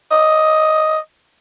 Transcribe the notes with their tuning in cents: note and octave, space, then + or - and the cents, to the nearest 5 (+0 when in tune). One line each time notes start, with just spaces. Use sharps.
D#5 +5